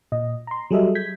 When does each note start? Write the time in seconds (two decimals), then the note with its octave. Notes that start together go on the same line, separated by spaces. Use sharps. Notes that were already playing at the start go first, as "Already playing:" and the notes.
0.12 A#2 D#5
0.47 A#5 C6
0.70 F#3 G3 G#4 A4 D#5 E5
0.95 G6 G#6 B6